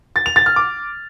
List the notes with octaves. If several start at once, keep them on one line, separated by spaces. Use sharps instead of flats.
A6
F7
A6
F6
D6